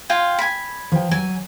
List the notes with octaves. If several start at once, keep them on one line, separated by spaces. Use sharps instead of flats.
F4 G5 G#5
G#5 B5
F3 G5
F#3 G#5